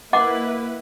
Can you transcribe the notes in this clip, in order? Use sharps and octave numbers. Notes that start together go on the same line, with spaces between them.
A#3 E4 B4 D#5 F#5 D6